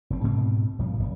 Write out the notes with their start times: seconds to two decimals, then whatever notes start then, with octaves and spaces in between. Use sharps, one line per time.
0.10 F1 C4
0.24 G#2 B2 C4
0.79 A#1 G2 F3
0.99 F1